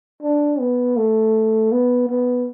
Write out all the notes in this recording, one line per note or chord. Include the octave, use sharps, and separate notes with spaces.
D4
B3
A3
B3
B3